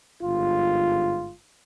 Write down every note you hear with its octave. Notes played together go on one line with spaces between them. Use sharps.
G1 G#2 F4